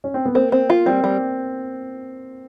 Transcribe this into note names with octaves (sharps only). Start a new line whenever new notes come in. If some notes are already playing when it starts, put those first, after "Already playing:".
C#4
C4
B3
A#3 C4
C4
F4
G3 C4
G3